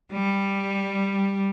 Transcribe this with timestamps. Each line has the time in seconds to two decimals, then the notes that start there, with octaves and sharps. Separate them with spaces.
0.12 G3